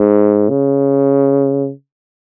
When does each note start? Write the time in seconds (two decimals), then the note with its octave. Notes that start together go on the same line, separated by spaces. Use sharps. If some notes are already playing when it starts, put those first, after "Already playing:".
Already playing: G#2
0.49 C#3